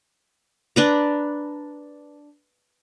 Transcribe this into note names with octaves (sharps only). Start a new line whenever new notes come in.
D4 B4 A#5